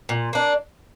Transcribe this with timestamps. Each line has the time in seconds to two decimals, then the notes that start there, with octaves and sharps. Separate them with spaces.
0.09 A#2
0.33 A#3 D4